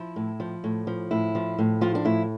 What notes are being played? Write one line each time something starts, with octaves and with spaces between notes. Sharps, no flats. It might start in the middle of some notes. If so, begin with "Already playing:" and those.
Already playing: F3 E4
A2
F3
A2
F3
A2 E4
F3
A2
F3 F4
D4
A2 E4